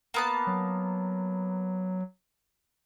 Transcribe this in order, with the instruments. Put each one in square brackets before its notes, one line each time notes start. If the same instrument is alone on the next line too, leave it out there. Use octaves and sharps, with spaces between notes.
[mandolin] A#3 B3 A5
[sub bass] F#3